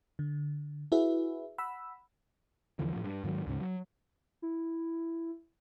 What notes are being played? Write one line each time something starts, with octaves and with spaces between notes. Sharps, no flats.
D3
E4 F#4 G#4 B4 E5
F#5 B5 E6
E2 D3 E3 F3
A2 F3
G2
G#2 D#3 E3 F#3
D2 G#2 C#3
F#3
E4